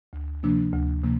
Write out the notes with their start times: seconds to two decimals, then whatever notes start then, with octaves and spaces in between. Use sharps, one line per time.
0.13 D2
0.43 C3 F3 A#3 D4
0.73 D2
1.03 C3 F3 A#3